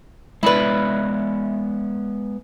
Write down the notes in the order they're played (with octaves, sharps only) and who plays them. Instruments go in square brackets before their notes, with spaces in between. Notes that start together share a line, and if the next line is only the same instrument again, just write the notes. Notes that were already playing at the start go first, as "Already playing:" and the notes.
[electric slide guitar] G#3 B3 D5 [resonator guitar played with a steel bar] E4 B4